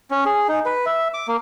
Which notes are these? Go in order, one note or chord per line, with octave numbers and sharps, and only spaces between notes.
C#4
G#4
D#4
B4
E5
D6
A#3